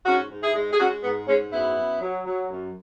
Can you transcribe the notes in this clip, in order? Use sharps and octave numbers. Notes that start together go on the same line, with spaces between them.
G#2 C#4 F#4
G#2
E4 G#4
G#3
G#4
G#3 C#4 F#4
G#2 B3
G#2 G#3 C#4
F#2 B3 E4
F#2
F#3
F#3
F#2